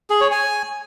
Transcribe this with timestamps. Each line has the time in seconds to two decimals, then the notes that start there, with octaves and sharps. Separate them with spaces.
0.10 G#4
0.21 C#5
0.32 G#5